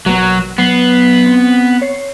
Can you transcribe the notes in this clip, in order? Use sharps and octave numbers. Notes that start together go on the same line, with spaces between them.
A#1 B2 F#3 A#3
F#3 B3 C7
C4
C#5 C7